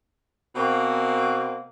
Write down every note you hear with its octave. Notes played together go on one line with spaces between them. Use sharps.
B2 A#3 C4